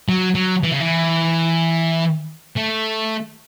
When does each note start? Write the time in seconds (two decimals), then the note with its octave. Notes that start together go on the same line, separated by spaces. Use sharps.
0.09 F#3
0.35 F#3
0.63 E3
0.72 C#3
0.81 E3
2.56 A3